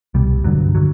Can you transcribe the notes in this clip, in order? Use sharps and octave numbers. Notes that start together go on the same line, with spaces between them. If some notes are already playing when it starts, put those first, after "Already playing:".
C2 B2 G3
G1 G2 D3 F#3
D3 F#3